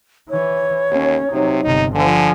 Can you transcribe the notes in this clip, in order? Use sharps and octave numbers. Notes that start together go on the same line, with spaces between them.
E3 C#5
D#2 C#4
C3 F#3 D#4
G1 C3 D#4
D3 F3 G#5